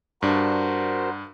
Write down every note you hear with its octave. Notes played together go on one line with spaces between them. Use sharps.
G2 D4 F#4 A#4 C5